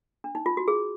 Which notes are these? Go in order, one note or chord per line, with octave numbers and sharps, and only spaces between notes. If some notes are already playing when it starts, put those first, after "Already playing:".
D4
D#4
F4
F#4
G#4